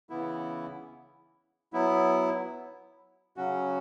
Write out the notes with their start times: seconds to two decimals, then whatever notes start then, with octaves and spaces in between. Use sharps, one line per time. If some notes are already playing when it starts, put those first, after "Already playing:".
0.10 C#3 E3 B3 E4
1.73 F#3 B3 E4
3.36 C#3 F#3 C#4 F#4